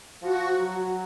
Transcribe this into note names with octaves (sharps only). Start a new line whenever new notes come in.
F3 F#4
F#3